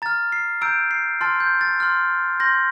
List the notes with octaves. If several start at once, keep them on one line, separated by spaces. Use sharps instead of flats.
A#5 F6 A6
C7
A#5 E6 G6 D7
C7
A5 C6 F6 A6
G6
A6
C6 F6
C6 G6 A#6